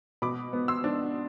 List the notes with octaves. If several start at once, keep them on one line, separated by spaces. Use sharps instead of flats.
B2 B5 D6
B3
C6 E6
D4